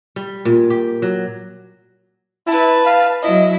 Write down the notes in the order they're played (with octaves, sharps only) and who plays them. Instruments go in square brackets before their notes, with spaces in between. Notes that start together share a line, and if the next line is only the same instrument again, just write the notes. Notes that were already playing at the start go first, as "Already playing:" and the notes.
[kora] G3
A#2
G4
F#3
[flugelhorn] E4 [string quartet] B4 A5
[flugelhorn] F5
[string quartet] F#3 E4 [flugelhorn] D#5